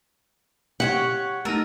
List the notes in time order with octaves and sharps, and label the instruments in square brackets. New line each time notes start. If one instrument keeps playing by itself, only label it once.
[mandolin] G4 C5 C#5 [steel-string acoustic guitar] F#5
[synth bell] A3 D#4 [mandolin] A#4